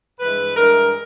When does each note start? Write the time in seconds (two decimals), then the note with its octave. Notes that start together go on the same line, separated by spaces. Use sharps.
0.20 G2 E3 G#3 B4
0.56 G2 E3 G#3 A#4